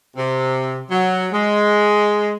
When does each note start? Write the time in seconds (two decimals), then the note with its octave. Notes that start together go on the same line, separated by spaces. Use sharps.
0.17 C3
0.91 F#3
1.33 G#3